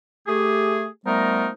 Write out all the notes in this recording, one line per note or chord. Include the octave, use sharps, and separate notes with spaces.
A3 G4 G#4
F3 G3 A3 B3 D#4 A#4